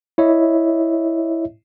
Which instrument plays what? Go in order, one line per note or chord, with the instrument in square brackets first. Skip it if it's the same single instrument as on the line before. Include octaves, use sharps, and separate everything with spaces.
[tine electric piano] E4 C#5 D#5 E5